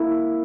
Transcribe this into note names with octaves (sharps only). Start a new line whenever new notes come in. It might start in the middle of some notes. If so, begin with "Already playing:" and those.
Already playing: A#3 E4